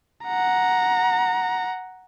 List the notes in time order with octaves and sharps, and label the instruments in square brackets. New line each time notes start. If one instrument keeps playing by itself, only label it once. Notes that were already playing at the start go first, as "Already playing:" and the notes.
[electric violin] F#5 A#5